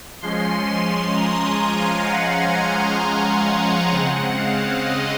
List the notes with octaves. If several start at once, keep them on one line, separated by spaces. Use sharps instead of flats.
F3 G#3 C#4 C6
C6
A#5
G#5
F5
F#5
C6
A#5
C#3 G#3 C4 F#5
F5
D#5